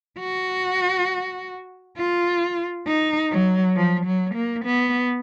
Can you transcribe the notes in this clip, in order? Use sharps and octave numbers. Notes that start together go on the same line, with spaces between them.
F#4
F4
D#4
F#3
F3
F#3
A#3
B3